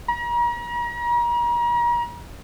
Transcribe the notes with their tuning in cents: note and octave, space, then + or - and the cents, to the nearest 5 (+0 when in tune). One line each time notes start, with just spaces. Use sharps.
A#5 +40